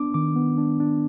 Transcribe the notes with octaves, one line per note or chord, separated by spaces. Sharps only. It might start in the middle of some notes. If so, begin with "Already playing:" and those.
Already playing: B3 D4 D6
D#3 D6
B3
D4
D4